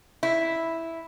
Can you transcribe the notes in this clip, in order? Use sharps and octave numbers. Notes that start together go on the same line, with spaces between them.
E4